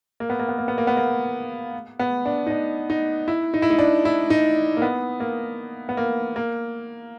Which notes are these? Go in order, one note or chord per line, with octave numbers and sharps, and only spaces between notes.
A#3
B3
A#3
B3
A#3
B3
A#3
B3
A#3
B3
D4
D#4
D4
D#4
E4
D#4
E4
D#4
D4
E4
D#4
A#3
B3
A#3
B3
A#3
A#3